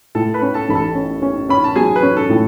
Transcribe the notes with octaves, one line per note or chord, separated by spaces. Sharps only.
A2 A4 A5
B4 B5
C#4
A4 A5
A1 B5
A4 A5
C#4
C#4
C#4 B5
A5
F#3 G#4 G#5
B4
C#4
A4
A2